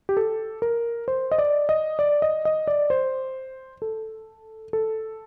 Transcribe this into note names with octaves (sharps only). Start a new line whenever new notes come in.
G4
A4
A#4
C5
D#5
D5
D#5
D5
D#5
D#5
D5
C5
A4
A4